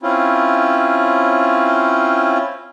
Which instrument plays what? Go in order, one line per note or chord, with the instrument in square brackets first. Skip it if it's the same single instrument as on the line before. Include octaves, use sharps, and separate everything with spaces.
[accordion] C4 C#4 E4 F4